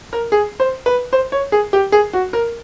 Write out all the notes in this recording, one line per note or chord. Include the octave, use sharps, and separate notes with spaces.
A#4
G#4
C5
B4
C5
C#5
G#4
G4
G#4
F#4
A#4